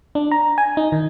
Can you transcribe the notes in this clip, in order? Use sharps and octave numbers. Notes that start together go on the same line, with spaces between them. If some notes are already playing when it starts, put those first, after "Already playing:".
D4
A#5
G#5
D#4
D#3